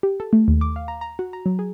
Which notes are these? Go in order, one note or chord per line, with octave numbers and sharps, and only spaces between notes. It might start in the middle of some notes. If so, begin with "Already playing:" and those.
G4
A4
A3
D#2
D6
F5
A#5
A#5
F#4
A#5
F#3
G#4